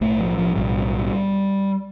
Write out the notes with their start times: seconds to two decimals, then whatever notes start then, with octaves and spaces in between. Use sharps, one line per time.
0.01 B1 A2 A3
0.19 F3
0.38 F3
0.55 B1 A2 G3